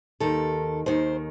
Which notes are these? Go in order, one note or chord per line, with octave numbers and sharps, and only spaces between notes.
D#2 D#3 A4
D#2 D#3 C5